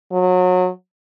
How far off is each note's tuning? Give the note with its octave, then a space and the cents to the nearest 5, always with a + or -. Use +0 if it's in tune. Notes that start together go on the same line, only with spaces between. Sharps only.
F#3 -25